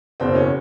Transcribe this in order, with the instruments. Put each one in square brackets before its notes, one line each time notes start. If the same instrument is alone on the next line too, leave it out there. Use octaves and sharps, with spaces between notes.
[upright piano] F#1 E2 B2 C4
C#4